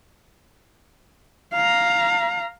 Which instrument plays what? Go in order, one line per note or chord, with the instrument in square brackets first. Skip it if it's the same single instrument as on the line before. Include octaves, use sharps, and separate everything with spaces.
[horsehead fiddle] F5 A#5